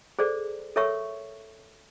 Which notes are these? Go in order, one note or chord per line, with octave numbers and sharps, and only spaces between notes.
G#4 A4 C5 D5
A4 A#4 C#5 E5 C#6 E6